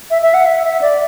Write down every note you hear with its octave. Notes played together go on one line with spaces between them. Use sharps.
E5
E5
F#5
E5
E5
D5